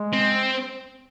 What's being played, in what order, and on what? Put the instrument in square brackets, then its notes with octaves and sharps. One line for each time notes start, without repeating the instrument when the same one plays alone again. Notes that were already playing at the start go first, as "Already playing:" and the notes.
Already playing: [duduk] G#3
[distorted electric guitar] C4